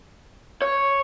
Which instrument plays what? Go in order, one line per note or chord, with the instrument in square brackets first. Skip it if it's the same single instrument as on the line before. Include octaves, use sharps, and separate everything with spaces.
[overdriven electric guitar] C#5